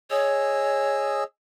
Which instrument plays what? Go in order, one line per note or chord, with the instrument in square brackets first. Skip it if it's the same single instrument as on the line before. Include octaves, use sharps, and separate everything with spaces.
[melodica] G#4 D#5 E6 [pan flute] C#5